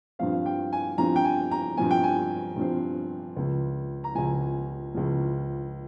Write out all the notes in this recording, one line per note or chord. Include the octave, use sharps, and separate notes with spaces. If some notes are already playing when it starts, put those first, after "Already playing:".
G2 F3 C4 F5
G5
G#5
G2 F3 C4 A#5
G5
G#5
A#5
G2 F3 C4 G#5
G5
G#5
G2 F3 C4
C#2 C#3 F3
A#5
C#2 C#3 F3 G#5
C#2 C#3 F3